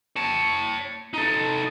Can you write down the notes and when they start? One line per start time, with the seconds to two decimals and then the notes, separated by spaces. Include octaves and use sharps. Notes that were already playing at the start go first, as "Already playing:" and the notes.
0.16 C#5 A5
1.14 D#4 A4